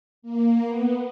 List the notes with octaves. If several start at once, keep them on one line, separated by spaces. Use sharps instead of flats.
A#3
B3